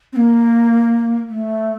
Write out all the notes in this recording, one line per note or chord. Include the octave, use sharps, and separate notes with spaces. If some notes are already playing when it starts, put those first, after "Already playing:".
C4
A#3
A3